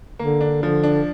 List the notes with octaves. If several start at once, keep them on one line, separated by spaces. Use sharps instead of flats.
D3 A#3
D4
D3 F3
D4